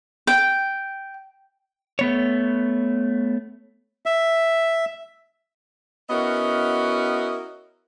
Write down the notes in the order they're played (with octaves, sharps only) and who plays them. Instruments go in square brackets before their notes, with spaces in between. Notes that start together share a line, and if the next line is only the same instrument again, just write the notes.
[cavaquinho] G5
[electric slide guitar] A3 B3 C#5
[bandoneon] E5
[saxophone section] B3 C#4 E4 F#4 A#4 D#5